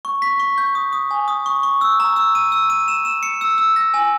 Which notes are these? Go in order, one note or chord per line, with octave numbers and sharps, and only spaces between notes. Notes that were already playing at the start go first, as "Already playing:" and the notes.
C#6
B6
C#6
G6
D#6
D#6
G#5
D#6
C#6
C#6
E6
A#5
E6
D#7
E6
D#7
E7
E7
C#7
E6
E6
A#6
G#5